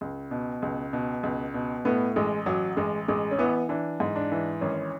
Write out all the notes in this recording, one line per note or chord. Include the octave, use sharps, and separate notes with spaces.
C#2
B2
C#2
B2
C#2
B2
A2 B3
A1 G#3
A1 F#3
A1 G#3
A1 G#3
C#4
E3 B3
E3 D4
G#2
D4
E3
G#1 C#4